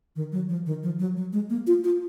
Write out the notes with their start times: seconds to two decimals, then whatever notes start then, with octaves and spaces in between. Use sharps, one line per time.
0.16 D#3
0.32 F#3
0.49 F3
0.66 D#3
0.83 F3
0.99 F#3
1.17 F#3
1.33 G#3
1.50 A#3
1.67 F4
1.84 F4